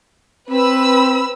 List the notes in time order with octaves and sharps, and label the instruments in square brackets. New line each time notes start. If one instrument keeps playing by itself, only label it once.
[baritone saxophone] C4 [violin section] B4 B5 E6